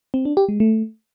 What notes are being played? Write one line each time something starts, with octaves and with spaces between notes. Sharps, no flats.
C4
D4
G4
G#3
A3